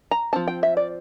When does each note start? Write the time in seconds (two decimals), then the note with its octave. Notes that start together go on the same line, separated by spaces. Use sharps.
0.11 A#5
0.33 F3 C4 A5
0.48 G5
0.63 E5
0.77 D5